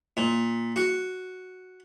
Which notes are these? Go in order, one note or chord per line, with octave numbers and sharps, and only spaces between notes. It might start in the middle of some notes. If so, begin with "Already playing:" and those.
A#2
F#4